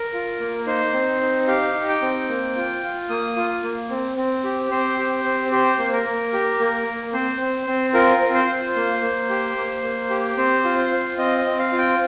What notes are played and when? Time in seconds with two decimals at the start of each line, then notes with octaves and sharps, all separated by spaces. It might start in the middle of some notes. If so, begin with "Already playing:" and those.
Already playing: A#4
0.13 F4
0.40 A#3
0.67 D#4 C5
0.93 C4
1.21 D#4
1.48 G4 F5
1.74 D#4
1.88 G5
2.02 C4
2.28 A#3
2.56 F4
2.83 F4
3.10 A#3 D#6
3.36 F4
3.63 A#3
3.90 C4
4.17 C4
4.44 G4
4.70 C4 C5
4.98 G4
5.24 C4
5.51 G4 C5
5.78 A#3
5.93 A#4
6.06 A#3
6.33 G4
6.59 A#3
6.86 A#3
7.13 C4 C5
7.40 C4
7.67 C4
7.94 F4 A#4
8.22 C4
8.34 C5
8.49 F4
8.76 A#3
9.02 A#3
9.29 G4
9.56 A#3
9.83 A#3
10.10 G4
10.37 C4 C5
10.64 F4
10.78 C5
10.91 F4
11.17 C4 D#5
11.38 D#5
11.45 C4
11.59 F5
11.72 F4
11.78 G5